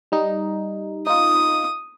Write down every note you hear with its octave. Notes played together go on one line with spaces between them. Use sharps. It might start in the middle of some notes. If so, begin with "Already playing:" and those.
G3 D#4
D#4 F4 D#6